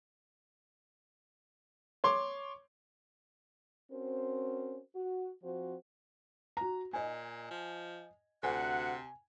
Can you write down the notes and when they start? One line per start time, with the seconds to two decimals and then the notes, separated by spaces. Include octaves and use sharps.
2.04 C#5 C6 D6
3.91 C4 C#4 F#4 A#4 C5
4.95 F#4
5.43 F3 C4 F#4 C5
6.57 F#4 A#5
6.93 A#2 D#5 G#5
7.51 F3
8.43 D2 C3 F#5 G#5